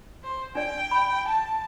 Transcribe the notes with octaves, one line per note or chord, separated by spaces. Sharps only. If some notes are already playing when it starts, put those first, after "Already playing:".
C5
D4 D5 G5
B5
A5